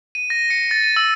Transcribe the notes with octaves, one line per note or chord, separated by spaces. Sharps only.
D#7
A#6
C#7
A6
D#7
E6